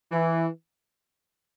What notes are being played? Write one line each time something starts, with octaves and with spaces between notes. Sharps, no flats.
E3